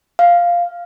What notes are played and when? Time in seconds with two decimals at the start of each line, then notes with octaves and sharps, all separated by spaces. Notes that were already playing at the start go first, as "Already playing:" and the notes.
0.19 F5